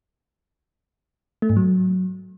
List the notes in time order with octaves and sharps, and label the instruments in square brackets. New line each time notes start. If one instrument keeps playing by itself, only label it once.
[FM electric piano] A3
G#2
F#3